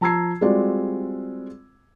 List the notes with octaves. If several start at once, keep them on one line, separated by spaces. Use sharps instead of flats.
F3 A5 A#5 E6 G#6 C7
G3 G#3 C4 F4 F#4 D5